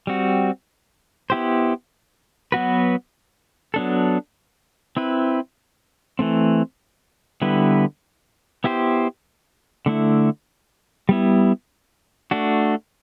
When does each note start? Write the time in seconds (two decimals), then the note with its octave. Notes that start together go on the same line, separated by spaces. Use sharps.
0.07 G3 C4 F#4
1.30 B3 E4 G4 C5
2.52 F#3 B3 F#4 B4
3.74 F#3 B3 D4 A4
4.97 C4 E4 B4
6.19 E3 A3 C4
7.42 D3 G3 B3 E4 B4
8.64 B3 E4 G4 C5
9.86 D3 A3 E4
11.09 G3 B3 E4
12.31 A3 D4 F#4